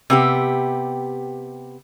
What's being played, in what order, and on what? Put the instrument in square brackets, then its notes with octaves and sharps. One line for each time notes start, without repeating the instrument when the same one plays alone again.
[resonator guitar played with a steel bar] C3 B3 G4